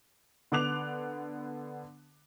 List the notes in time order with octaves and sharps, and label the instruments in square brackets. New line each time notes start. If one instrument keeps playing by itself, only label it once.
[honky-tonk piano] D3 B3 D6 F#6 F7